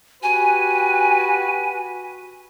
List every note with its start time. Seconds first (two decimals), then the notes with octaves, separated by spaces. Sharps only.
0.23 F#4 G4 B4 G#5